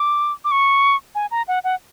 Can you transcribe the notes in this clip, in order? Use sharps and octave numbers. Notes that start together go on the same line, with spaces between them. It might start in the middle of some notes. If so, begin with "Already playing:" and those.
Already playing: D6
D6
C#6
G#5
A#5
F#5
F#5